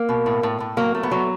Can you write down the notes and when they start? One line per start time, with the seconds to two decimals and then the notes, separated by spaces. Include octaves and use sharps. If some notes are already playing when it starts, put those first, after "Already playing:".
Already playing: A#3
0.09 B2
0.26 A2
0.43 A2
0.60 A2
0.77 F#3 A#3
0.95 A3
1.03 B3
1.11 F#3